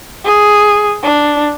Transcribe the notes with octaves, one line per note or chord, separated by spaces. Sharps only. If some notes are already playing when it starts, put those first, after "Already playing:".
G#4
D4